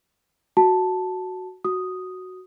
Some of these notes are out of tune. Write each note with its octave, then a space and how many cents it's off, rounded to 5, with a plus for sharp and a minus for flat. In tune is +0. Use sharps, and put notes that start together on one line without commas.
F#4 +0 A5 +0
F#4 +0 D#6 +0